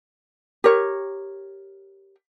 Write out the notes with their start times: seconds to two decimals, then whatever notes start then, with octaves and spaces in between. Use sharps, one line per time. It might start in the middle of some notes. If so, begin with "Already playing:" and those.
0.64 G4 A#4 C#5